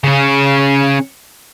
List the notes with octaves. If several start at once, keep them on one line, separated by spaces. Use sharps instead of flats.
C#3 C#4